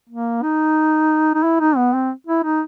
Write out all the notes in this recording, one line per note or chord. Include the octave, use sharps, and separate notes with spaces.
A#3
D#4
D#4
E4
D#4
B3
C4
E4
D#4